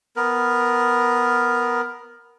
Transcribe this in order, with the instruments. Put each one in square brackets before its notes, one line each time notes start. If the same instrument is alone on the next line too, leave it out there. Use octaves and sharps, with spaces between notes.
[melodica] B3 A#4